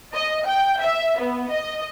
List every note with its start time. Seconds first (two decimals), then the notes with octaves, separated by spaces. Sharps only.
0.14 D#5
0.47 G5
0.81 E5
1.19 B3
1.52 D#5